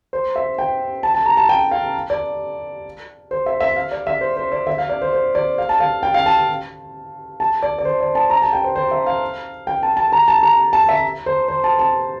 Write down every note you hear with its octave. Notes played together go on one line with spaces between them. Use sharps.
C5
E5
G5
A5
A5
A#5
A5
G5
F5
D5
C5
E5
E5
F5
D5
E5
C5
C5
D5
E5
F5
D5
C5
C5
D5
F5
A5
F5
G5
F5
A5
A5
D5
D5
C5
D5
A5
A#5
A5
G5
C5
C5
E5
F5
G5
A5
A5
A#5
A5
A#5
A5
E5
C5
C5
A5
A5